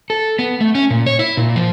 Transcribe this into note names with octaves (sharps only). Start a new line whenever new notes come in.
A4
B3
A3
C#4
A#2
C#5
E4
A#2
F3